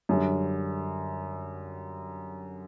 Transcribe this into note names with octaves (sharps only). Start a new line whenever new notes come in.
F#2 D3 G3